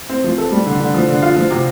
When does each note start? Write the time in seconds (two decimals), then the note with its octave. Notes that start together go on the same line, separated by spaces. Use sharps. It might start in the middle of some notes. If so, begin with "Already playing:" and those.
0.09 C4
0.24 F3
0.38 A4
0.52 G3
0.66 D3
0.80 D3
0.94 F3
1.08 D3
1.22 F4
1.36 F3
1.51 C3